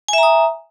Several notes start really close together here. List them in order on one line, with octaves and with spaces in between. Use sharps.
G#5 E5 A#5 D#6